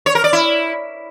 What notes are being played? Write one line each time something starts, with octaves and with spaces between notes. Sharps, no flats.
C#5
A#4
D5
E4